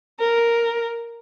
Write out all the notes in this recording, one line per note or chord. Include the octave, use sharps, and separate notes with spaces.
A#4